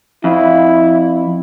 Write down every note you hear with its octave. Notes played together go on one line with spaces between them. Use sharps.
F2 E4